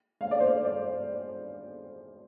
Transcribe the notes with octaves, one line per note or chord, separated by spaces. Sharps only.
F5
D5
C5
D5
D5